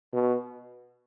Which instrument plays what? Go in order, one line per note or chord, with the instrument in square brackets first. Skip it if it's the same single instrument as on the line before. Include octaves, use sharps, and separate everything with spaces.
[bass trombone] B2